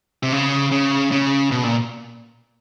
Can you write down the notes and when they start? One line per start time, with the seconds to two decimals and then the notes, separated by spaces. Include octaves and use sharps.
0.23 C3
0.32 C#3
0.71 C#3
1.12 C#3
1.52 B2
1.64 A#2